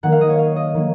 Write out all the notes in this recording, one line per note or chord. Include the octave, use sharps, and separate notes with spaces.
D#3 F#3 A#3 F#5
F5
D#5
C#5
F5
D#5
D#3 F#3 A#3